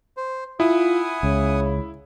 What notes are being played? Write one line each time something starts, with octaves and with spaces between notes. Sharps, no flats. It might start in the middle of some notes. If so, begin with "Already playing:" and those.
C5
E4 F4 F#5 G#5 D#6
C#2 C#3